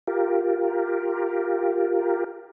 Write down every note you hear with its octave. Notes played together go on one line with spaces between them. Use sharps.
F4 G4 A#4